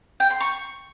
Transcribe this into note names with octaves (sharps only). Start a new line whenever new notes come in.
G5
C6
C#6